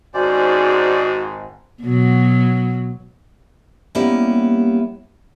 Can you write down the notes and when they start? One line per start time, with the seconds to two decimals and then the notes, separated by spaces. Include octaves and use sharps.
0.14 G#1 G#2 C#4 F#4 C5 D5
1.81 B2 F#3
3.95 G3 A#3 B3 C#4 E4 G4